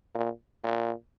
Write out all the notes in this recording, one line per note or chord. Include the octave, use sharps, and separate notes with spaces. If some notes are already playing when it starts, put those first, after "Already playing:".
A#2
A#2